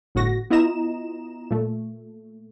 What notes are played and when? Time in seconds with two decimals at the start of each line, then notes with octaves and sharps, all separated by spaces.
0.15 G1 A2 F#4 A#6
0.50 B3 E4 F4 D#5 A#5 E7
1.51 A#2 A3